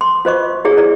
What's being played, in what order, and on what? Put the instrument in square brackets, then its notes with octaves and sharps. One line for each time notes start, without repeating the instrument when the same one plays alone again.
[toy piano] C6
F4 C5 D#5 C#6
E4 G4 G#4 C#5
E4 D5